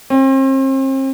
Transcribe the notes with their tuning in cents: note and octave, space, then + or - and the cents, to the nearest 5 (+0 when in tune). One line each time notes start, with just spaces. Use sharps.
C4 +40